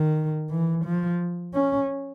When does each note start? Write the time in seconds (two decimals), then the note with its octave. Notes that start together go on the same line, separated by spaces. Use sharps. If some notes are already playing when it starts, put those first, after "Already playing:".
Already playing: D#3
0.50 E3
0.85 F3
1.54 C#4